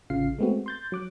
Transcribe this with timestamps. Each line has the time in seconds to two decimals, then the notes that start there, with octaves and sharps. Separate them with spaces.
0.10 A1 C#3 F4 F5 C7
0.39 G#3 A3 B3 C4 F#4
0.66 C6 G6 A6
0.92 F#3 D6 F#6